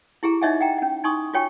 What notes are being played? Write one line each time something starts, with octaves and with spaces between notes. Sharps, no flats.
E4 G4 G#4 A#5
D#4 C#5 D#5 E5 F#5 G#5
F#5 G5 A#5
C#4 F#5
D#4 G#5 C6 C#6 D#6
F4 F#4 C#5 G5 G#5 C#6